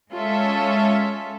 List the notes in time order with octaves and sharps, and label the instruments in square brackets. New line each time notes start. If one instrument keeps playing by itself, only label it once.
[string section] G#3 C#4 F4 A4 E5